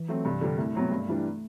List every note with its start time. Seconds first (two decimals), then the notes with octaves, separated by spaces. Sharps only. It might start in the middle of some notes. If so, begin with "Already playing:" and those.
Already playing: E3
0.08 F#3 A3 C4
0.25 G2 C3
0.41 D3 G3 D4
0.58 C2 A3
0.75 B2 F#3 C4
0.91 G2
1.08 E3 G3 D4